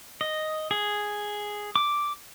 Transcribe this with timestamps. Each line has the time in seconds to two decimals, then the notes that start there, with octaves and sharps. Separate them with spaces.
0.21 D#5
0.71 G#4
1.76 D6